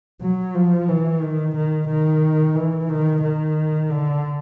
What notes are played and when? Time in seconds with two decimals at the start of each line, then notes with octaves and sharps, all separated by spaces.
0.22 F#3
0.55 F3
0.88 E3
1.22 D#3
1.56 D#3
1.88 D#3
2.55 E3
2.89 D#3
3.22 D#3
3.90 D3